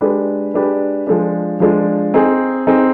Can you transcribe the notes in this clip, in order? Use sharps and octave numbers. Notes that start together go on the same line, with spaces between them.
G#3 D4 G4 B4
G#3 D4 G4 B4
F3 G#3 D4
F3 G#3 D4
C4 D#4 G#4
C4 D#4 G#4